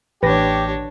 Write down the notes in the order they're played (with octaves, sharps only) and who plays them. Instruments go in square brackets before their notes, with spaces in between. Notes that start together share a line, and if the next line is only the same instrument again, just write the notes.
[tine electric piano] A1 A#6 [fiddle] D4 C#5 [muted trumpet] G4 [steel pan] B4